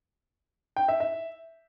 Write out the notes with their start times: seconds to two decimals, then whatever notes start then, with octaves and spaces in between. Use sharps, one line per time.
0.77 G5
0.88 E5
1.00 E5